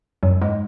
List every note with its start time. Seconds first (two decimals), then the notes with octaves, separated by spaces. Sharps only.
0.23 F#2 F#3
0.42 G#2 G#3